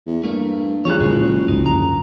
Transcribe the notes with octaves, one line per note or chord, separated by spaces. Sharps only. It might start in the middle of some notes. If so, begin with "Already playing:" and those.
E2
G2 A3 A#3
E3 F3 G3 G#4 C#5 F#6
F#1 C#2 A#2 D3 G#3
C#2 G#2 D#4
F#2 D3 A#5